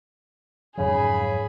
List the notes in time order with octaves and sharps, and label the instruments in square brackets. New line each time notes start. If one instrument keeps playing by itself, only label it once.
[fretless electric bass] F2 G#2 F#3 [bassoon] C#3 [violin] G#4 B5